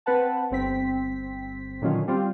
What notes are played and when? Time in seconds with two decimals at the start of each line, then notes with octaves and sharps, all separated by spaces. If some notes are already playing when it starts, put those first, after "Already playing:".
0.06 C4 B4 F#5 A5
0.51 G1 C4 B6
1.82 A#2 D3 D#3 F#3 C#4 F4
2.08 G3 C4 F4